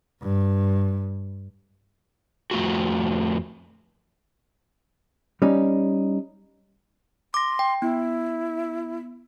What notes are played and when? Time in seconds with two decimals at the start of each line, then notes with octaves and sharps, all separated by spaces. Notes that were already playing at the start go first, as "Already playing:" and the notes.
0.22 G2
2.51 F2 A3 F4 F#4
5.42 G3 C#4 D#4
7.34 C6 D6 A#6
7.59 G5
7.82 B3 E4